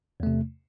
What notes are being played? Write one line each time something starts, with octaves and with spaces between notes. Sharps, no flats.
E2 C3 A3